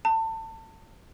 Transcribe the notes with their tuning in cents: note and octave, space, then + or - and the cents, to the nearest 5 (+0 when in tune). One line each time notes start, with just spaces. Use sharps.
A5 +30